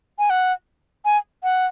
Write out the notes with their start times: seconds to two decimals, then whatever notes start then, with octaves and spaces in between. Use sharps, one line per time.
0.19 G#5
0.30 F#5
1.05 G#5
1.43 F#5